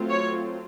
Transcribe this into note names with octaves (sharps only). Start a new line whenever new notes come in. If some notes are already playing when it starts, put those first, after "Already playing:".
Already playing: F#3 A3 C4 F4
C#5